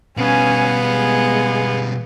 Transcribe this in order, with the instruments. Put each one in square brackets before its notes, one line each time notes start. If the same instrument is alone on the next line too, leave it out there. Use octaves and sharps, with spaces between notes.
[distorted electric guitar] B2 G3 [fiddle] B3 F5 [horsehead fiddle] C#4 G#5
[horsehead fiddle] G#3 G#4